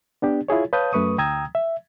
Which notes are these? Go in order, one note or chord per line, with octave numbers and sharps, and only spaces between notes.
B3 D4 G4
E4 F4 G#4 C#5
B4 C#5 F5 A5 D#6 G6
F#2 A3 B4 C#6 D#6
D2 G5 A#5 D#6 E6 G#6
E5